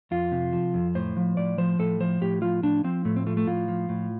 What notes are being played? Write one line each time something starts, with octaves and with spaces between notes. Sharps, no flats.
F2 F4
C3
F3
F2
A2 C5
F3
A2 D5
F3 C5
A2 A4
F3 C5
A2 G4
F3 F4
A2 D4
F3 C4
A2 A3
C4
F3 A3
A3
A2 F4
F3
A2